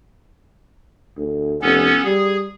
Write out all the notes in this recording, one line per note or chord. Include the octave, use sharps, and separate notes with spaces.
D2
F1 B3 C#4 A4
G3 G#4